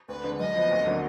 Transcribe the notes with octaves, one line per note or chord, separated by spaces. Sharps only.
D2 B4
D3 G#3
F#2 D#5
F3 B3
D2
D3 F#3 A#3 D#4